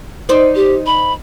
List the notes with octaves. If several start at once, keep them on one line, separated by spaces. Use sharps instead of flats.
D#4 C5 D5
G4
B5